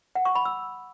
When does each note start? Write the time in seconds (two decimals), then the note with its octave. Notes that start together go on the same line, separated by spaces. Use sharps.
0.15 F#5
0.25 C#6
0.35 B5
0.45 E6